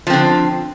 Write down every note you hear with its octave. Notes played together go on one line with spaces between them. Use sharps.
D3 F3 C4